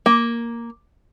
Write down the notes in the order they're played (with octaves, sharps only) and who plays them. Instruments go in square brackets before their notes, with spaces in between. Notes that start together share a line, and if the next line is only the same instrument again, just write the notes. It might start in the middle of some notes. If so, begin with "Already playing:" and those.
[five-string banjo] A#3